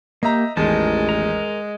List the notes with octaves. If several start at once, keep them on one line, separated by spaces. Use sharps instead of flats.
A#3 G4 D#5 E5 A#5
A1 E2 D#3 G#3 A#4 A5
A#4 A#5